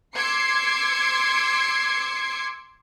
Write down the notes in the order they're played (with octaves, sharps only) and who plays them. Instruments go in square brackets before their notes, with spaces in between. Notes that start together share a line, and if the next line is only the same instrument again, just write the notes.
[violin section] C6 D6 E6 G#6 C7 C#7